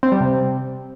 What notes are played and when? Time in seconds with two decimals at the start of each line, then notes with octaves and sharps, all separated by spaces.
0.03 C4
0.12 G3
0.21 C3